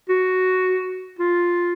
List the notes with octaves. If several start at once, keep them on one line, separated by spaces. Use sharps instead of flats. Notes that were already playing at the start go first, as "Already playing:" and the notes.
F#4
F4